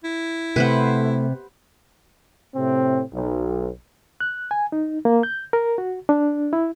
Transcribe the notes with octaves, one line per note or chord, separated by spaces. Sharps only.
E4
C3 A3 B4 C5 F#5
A2 C3 C4
B1
F#6
G#5
D#4
A#3
G6
A#4
F#4
D4
E4